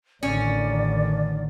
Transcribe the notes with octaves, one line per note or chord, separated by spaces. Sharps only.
A1 D3 D#3 C#4 D5